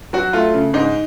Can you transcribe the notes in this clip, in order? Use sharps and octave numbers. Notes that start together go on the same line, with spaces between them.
F#3 F#4
A3 F4
C#3
G#2 D#4